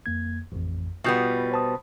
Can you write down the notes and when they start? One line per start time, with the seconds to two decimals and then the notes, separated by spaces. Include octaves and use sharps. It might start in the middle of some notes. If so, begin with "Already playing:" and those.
0.06 F2 A#3 G#6
0.52 A1 F2
1.04 B2 G3 B3 F4 G6
1.52 C5 A5 D#6